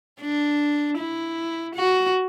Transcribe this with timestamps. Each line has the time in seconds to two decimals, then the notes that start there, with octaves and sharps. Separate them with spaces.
0.21 D4
0.98 E4
1.75 F#4